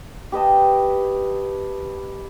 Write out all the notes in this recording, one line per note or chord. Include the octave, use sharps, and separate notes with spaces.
G4 B4 D#5 A5